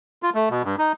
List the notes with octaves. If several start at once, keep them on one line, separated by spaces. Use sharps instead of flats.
F4
A3
B2
G2
D#4